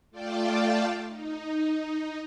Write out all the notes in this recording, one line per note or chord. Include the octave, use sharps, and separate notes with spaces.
A3 F4 D5 F5 G5 A5
D#4